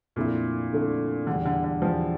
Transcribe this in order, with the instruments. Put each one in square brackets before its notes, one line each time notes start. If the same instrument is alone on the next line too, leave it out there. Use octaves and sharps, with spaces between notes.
[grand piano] F2 D3 A3 E4 [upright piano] A#2
[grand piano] F2 D3 A3 E4
[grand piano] E2 E3 G3 [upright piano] D3
[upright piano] D3
D3
[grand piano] E2 E3 G3 [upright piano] F3